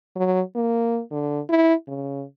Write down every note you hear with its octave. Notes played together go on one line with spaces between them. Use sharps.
F#3
A#3
D3
E4
C#3